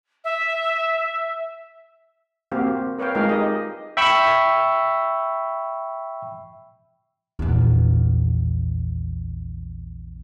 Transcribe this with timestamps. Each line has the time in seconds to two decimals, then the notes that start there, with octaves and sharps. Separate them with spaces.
0.24 E5
2.52 A#3 C4 F#4 G4 F5
2.99 A#4 B4 C#5 F5 G5
3.15 G#3 D#4 F4 A#4 F5 G5
3.29 D#4 G4 D#5
3.97 E5 G5 B5 C#6 E6
7.39 A#1 E2